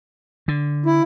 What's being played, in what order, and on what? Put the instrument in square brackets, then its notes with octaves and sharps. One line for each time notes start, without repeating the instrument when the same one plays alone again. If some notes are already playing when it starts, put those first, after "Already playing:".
[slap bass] D3
[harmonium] E4